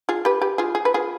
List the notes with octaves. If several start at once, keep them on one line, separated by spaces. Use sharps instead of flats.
F4 G#4
G4 B4
G4 B4
F4 G#4
G#4
B4
F4 G#4